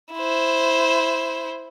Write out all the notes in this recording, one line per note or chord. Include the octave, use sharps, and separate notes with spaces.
E4 C5